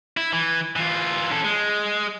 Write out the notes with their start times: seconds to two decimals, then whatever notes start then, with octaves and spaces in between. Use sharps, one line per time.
0.17 E4
0.33 E3
0.76 E3 F4
1.31 C#4 A4
1.44 G#3